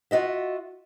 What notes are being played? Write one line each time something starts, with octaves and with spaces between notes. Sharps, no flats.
F4 F#4 D#5 E5